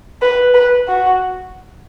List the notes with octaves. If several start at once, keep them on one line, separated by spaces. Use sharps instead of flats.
B4
B4
F#4